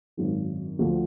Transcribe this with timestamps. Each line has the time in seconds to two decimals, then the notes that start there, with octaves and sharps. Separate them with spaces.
0.17 G#1 F#2 D#3
0.79 D2 D3 F3